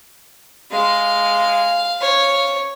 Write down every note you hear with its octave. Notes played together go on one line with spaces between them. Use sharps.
G#3 F5
C#5